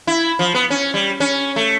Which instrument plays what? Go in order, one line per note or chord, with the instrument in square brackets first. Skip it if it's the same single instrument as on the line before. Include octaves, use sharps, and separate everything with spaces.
[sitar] E4
F3
B3
C#4
G3
C#4
A3